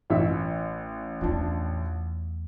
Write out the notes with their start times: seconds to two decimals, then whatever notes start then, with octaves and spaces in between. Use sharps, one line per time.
0.10 A1 E3 E5 E6
1.21 E2 F3 A3 D4